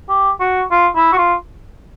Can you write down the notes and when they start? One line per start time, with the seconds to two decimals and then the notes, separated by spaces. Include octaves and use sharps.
0.09 G4
0.40 F#4
0.71 F4
0.96 E4
1.13 F#4
1.18 F4